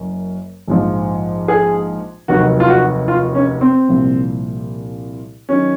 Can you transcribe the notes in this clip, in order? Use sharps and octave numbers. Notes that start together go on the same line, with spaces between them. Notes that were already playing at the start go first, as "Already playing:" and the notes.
Already playing: F#1 F#2
A#1 G#2 F3
G#4
F1 D#2 D#3 F#3 F#4
F4
F#4
F4
C#4
C4
C2 A#2 F3
D#3 F#3 C#4